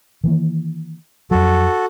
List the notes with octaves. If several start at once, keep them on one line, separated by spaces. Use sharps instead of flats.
D#3 E3 A#3
F2 F#3 F#4 A4